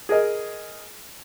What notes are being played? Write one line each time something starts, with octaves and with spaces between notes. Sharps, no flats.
G#4 A#4 D#5